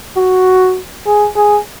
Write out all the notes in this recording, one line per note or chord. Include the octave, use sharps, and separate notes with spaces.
F#4
G#4
G#4